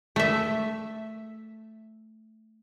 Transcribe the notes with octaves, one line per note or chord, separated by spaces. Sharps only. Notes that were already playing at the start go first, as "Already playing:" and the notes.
A3 E5